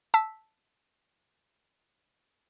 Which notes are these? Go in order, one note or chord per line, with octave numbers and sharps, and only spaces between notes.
A5 E6 B6